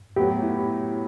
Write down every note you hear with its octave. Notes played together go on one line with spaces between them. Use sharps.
A2 F#3 B3 F#4 G4 B4
E4